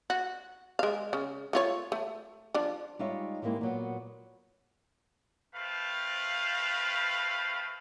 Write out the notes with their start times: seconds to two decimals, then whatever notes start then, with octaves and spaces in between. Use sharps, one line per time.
0.10 F#4
0.79 G#3 F5
1.13 C#3
1.53 A3 F4 C#5
1.92 A3
2.54 F3 D4
2.99 G3 G#3 D#4 F4 C#5 E5
3.42 E3 G3 G#3 A#3 C4 E4
3.61 A#2 F#3 B3
5.56 A3 C4 B4 F5